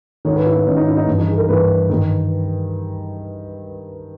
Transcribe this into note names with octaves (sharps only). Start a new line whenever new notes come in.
G#2 D#3 C#5
B4
E4
B3
G#2 D#3 C#4
D#4
E4
D#4
G2 E3 C#4
D#4
G#4
A#4
G2 E3 B4
G2 D#3